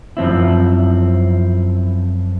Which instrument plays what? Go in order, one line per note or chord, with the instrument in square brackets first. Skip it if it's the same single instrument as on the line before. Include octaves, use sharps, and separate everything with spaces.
[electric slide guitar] F#2 F3 C4 E4